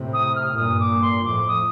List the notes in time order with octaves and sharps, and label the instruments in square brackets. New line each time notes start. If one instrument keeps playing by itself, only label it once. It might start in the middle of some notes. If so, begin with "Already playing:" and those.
Already playing: [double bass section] A2 C3
[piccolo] D#6
F6
[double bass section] G2 A#2 [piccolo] D#6
[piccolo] D6
C6
[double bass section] F2 A2 [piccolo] D6
[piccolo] D#6